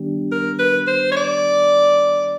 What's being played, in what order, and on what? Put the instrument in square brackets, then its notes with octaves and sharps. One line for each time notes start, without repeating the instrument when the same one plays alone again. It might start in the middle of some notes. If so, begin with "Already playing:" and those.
Already playing: [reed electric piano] D#3 G3 B3 D4 G4
[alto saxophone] A#4
B4
C5
C#5
D5